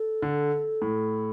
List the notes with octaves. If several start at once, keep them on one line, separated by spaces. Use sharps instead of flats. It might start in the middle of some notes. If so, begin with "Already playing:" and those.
Already playing: A4
D3
A2